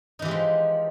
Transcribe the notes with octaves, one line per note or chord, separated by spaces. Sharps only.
E3 F3 G#3 D#4 G4